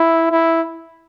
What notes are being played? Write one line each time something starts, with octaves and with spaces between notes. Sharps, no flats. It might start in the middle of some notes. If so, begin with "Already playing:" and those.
Already playing: E4
E4